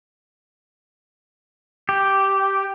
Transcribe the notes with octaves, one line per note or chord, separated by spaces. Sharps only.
G4